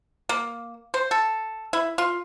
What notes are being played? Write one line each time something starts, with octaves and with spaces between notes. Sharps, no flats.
A#3
C5
A4
E4
F4